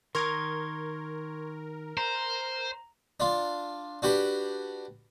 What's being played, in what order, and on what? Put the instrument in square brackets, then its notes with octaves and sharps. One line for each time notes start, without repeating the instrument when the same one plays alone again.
[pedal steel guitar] D#3 A#5 D#6 [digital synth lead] A#4 [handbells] C6 C#6 G#6
[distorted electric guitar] C5 [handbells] A#5
[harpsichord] D4 F4
D4 F#4 G4 B4